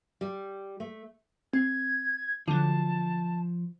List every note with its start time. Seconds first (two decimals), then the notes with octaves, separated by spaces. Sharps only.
0.21 G3
0.80 A3
1.53 C4 G#6
2.48 D3 F3 F#3 A5